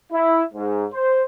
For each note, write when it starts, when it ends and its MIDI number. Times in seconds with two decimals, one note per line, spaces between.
0.12 0.42 64
0.54 0.85 44
0.93 1.22 72